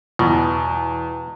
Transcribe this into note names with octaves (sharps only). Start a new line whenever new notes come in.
E2 B2